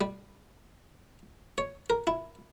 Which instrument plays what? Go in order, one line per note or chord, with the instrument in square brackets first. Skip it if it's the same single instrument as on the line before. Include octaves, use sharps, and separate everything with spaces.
[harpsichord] G3
C#5
A#4
E4